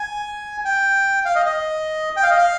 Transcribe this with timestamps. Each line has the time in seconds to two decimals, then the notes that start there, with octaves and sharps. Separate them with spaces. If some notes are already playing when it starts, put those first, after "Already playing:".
Already playing: G#5
0.65 G5
1.25 F5
1.35 D#5
1.46 D#5
2.17 G5
2.23 F5
2.31 D#5
2.38 F5